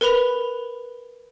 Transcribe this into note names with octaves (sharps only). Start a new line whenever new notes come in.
A#4 B4 B5 F7